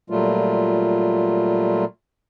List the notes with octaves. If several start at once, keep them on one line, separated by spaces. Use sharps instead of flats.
A#2 F#3 G3 A3 F4